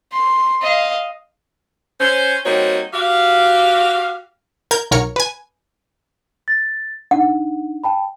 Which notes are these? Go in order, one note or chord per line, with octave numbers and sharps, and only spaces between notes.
C6
D#5 F5
C#4 C5
G3 A#3 C4 D#4 F#4 C#5
F#4 G4 F5
A#4 G6 G#6
B1 A#4 C#5 F6 C#7
B4 G#5
A6
D4 D#4 F#5
G5 A5 B5